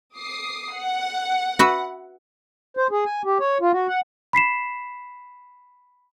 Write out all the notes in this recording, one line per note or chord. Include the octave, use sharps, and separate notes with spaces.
D6 D#6 C7
F#5
F#4 B4 E5
C5
G#4
G#5
G4
C#5
F4
F#4
F#5
B5 B6 C7 E7